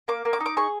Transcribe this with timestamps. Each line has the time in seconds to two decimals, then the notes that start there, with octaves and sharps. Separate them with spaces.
0.08 A#3 D6
0.25 A#3
0.33 D6
0.40 D#4
0.46 D6
0.57 G#4 C#6